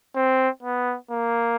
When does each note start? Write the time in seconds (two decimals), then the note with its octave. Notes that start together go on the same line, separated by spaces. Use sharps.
0.16 C4
0.63 B3
1.11 A#3